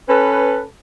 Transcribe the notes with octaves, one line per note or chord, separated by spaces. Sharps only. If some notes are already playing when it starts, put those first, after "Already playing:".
C#4 A4 B4